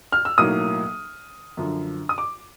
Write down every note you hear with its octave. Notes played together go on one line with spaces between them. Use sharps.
F6
E6
B1 A2 F#3 A#3 D#6
F#2 D3 F3
D#6
D6